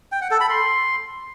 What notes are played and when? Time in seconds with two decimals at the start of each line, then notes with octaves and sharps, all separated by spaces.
0.12 G5
0.21 F#5
0.31 A4
0.40 B5
0.50 C6